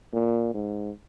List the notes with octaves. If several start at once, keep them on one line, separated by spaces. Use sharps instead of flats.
A#2
G#2